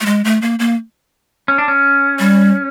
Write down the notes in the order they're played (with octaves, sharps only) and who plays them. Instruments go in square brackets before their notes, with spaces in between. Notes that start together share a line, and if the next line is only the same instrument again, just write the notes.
[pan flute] A3
G#3
A3
A#3
A#3
[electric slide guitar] C#4
D4
C#4
[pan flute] G3